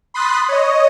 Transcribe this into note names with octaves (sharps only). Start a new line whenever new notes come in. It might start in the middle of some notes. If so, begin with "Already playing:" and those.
B5 C6 D#6 F#6 A6 B6
C#5 D#5